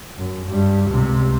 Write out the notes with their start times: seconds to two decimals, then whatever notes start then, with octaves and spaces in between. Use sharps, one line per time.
0.18 F#2
0.49 G2 G3
0.89 C#2 C3